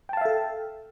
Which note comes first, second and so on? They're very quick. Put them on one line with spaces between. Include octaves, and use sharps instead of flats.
G5 A5 F5 E5 A4